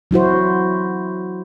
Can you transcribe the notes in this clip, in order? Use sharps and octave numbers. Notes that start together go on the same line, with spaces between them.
F#3 E4 F#4 C5